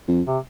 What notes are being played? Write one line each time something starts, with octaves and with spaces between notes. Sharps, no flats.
F2
C3